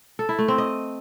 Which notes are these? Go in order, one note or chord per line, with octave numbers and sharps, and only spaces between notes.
A4
E4
A3
C4
D#5